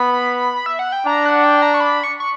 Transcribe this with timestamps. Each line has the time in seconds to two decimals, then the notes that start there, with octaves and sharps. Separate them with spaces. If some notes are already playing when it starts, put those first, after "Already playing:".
Already playing: B3 B5
0.66 E5
0.79 F#5
0.92 G5
1.06 D4 A#5
1.26 F#5
1.44 G5
1.62 A#5
1.74 C#6
1.80 B5
2.04 C#6
2.20 C#6